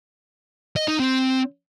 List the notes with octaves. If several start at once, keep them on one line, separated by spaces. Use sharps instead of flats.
D#5
D#4
C4